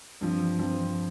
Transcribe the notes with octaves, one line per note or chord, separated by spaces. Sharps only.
G2 F3 C4
G2 F3 C4